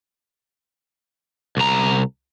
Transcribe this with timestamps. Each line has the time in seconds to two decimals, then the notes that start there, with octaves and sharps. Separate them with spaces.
1.57 C2 A#5